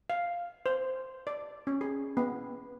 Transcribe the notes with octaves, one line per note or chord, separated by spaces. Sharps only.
F5
C5
D5
C#4
G#4
B3